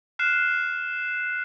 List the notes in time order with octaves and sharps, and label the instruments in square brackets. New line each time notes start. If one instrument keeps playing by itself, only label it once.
[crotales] F6 F#6 C7 E7